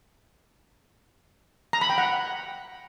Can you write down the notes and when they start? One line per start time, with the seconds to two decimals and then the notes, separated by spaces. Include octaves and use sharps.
1.73 A#5
1.81 B5
1.90 G5
1.98 F#5